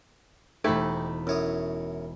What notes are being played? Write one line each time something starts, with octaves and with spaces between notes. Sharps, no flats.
E1 A3 D#4 G4 C5 B5 G#6
F#2 E4 C#5 D#6